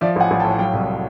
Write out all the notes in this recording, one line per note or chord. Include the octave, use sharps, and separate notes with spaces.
F3 D5 E5
A1 F#5 G#5
A1
G5 A5
A2
F#3 F5 G5
C2